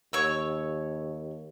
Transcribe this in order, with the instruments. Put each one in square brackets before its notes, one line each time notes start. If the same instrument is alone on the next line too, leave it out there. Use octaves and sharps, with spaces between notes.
[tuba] D#2 [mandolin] C#5 E6